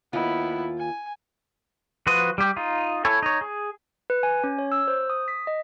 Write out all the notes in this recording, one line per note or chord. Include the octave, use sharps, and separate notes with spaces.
D#2 B3 E4 F4
G#5
F3 F#4 B4 C6 D#6
G3 G4
D#4 F4
E4 A4 C#5 G#5
D#4 C#5
G#4
B4
G#5
C#4
C#5
E6
C5
D#6
B6
D#5